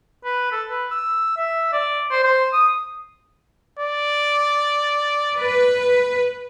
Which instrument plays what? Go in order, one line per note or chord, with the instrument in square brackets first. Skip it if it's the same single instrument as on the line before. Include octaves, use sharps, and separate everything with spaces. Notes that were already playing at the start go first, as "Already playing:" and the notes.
[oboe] B4
A4
B4
E6
E5
D5
C5
C5
D#6
[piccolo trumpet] D5
[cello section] B4